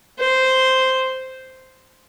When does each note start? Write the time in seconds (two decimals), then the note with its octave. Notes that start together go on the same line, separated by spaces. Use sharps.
0.18 C5